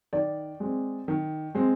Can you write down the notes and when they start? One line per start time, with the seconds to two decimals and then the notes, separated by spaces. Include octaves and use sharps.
0.13 D#3 D5
0.60 G#3 C4
1.08 D#3
1.55 G#3 C4